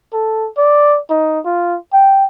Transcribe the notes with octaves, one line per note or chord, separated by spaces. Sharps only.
A4
D5
D#4
F4
G5